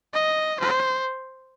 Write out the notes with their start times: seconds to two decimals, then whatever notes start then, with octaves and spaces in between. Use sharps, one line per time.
0.14 D#5
0.60 C5